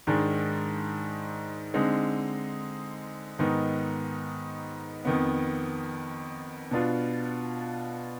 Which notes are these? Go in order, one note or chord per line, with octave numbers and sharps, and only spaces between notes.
G#2 D#3 G#3 D4
D3 G#3 C4 D#4
G#2 D#3 B3 D#4
F2 D#3 B3
B2 B3 D4 F4